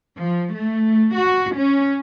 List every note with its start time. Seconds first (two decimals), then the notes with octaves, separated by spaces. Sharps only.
0.17 F3
0.54 A3
1.16 F#4
1.55 C#4